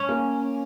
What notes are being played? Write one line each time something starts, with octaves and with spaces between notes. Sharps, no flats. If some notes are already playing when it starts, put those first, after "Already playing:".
Already playing: C#4
A#3